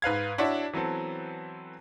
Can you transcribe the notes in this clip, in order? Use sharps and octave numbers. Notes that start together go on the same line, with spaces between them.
G#2 B4 F5 G#6
D4 E4 F#4 C#5 E5
E3 F#3 B3 C4 A4